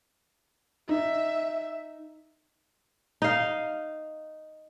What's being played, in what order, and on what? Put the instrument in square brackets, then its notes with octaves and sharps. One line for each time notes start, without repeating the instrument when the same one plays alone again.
[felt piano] D#4 [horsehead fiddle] E5
[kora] D#4 F5